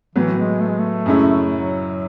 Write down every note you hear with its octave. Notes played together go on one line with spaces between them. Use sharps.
A2 E3 F#3 B3
G#3
A3
G#3
A3
F#2 C#3 G#3 C#4 E4
F#3